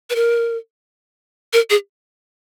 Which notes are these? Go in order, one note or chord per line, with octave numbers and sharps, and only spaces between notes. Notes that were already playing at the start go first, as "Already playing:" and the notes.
B4
A#4
A#4
G#4